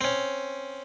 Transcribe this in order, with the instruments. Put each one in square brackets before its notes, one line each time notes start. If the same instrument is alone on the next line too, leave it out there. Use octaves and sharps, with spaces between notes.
[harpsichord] C4 C#4